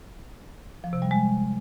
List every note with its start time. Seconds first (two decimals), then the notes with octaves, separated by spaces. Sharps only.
0.84 F3
0.93 C3
1.02 G3
1.11 G#3